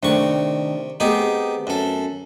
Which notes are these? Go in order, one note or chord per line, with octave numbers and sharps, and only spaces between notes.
C3 D#3 A3 D4 C#6
A3 B3 C4 D#4 G4 G#4
F#2 A4